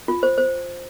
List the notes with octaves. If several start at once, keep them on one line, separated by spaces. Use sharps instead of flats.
F4
C5
C5